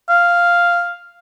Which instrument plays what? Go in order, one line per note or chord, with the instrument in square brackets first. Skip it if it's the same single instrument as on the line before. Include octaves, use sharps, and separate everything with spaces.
[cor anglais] F5